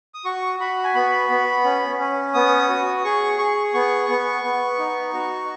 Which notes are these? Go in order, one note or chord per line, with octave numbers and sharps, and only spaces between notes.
D#6
F#4 C#6
F#4 B5
G#5
B3 B5
B3
C#4
C#4
B3 D#6
F#4
G#4 C#6
G#4 C#6
B3 C#6
B3
B3
D#4
F#4